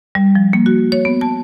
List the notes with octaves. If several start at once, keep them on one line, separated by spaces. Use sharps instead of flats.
G3
F3
A#3
F#4
C#5
B3
A5